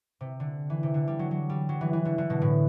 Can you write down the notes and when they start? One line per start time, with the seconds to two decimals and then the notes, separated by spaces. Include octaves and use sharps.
0.21 C3
0.40 D3
0.70 E3
0.83 C3
0.94 D3
1.08 G3
1.19 F#3
1.31 F#3
1.50 G3
1.69 F#3
1.81 E3
1.93 E3
2.05 D3
2.18 D3
2.30 B2
2.42 A2